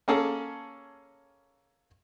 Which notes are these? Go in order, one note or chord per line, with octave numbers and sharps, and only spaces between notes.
A#3 C#4 G#4 A4 A5